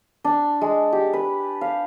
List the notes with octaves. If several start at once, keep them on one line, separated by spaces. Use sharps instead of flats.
D4
G#3
G4
B4
F5